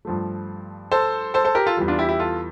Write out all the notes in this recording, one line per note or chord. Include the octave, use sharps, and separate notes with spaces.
G2 F3 A3
A4 C5
A4 C5
A4 C5
G4 A#4
F4 A4
E2 E3 G3
D4 F4
E4 G4
E4 G4
F4 A4